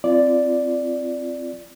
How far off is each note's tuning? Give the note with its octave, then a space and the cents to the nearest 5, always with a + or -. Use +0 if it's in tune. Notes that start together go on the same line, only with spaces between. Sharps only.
C4 +0 F4 -30 D5 +0